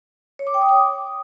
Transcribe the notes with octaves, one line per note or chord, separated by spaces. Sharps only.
C#5
D6
G5
D#6
D6